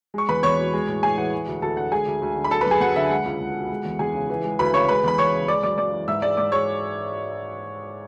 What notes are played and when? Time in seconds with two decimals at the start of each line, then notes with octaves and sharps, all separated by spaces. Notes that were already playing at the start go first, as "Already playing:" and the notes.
0.14 G#3 C#6
0.29 E2 B4 B5
0.43 E2 C#5 C#6
0.59 B2
0.73 G#3
0.88 A2
1.03 A2 G#4 G#5
1.18 E3 F#5
1.33 G#3
1.47 D2
1.62 D2 A4 A5
1.77 D3 F#5
1.92 G#3 G#4 G#5
2.06 D2
2.22 D2
2.36 D3
2.44 B5
2.51 F#3 A4 A5
2.61 B4 B5
2.66 F#2 G#4 G#5
2.81 F#2 F#5
2.96 D3 E5
3.11 G#3 F#5
3.26 C#2
3.40 C#2
3.55 B2
3.70 G#3
3.85 E2
3.99 E2 G#4 G#5
4.14 C#3
4.30 E3
4.44 G#3
4.59 D2 B4 B5
4.74 C#3 C#5 C#6
4.89 G#3 B4 B5
5.04 E2 B5
5.18 E2 C#5 C#6
5.33 C#3
5.48 G#3 D5 D6
5.63 F#2 D5 D6
5.78 F#2 D5 D6
5.93 E3
6.08 G#2 E5 E6
6.22 G#3 D5 D6
6.37 G#2 D5 D6
6.52 G#3 C#5 C#6